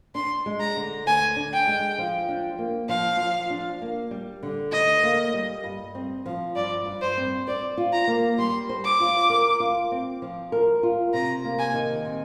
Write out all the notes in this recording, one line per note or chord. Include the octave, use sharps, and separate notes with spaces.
D4 C6
G#3
A#5
D3
D2 G#5
D4
G5
G#3
F3
D4
A#3
F3 F5
F3
D4
A#3
G3
D3
D2 D#5
A#3
G3
G2
C4
F3
G2 D5
G2
C5
C4
C5 D5
F4
A#5
A#3
G3 C6
C5
D6
F4
A#4
F4
C4
F3
A#4
F4
C3 A#5
A#3
G#5
D#3
C3